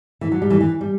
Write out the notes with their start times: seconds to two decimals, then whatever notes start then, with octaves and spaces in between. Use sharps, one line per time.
0.21 E3
0.32 F#3
0.42 G3
0.50 E3
0.61 E3
0.81 G3